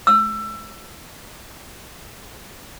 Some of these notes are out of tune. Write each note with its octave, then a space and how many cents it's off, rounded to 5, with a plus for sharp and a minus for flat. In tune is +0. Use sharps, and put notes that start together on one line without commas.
E6 +25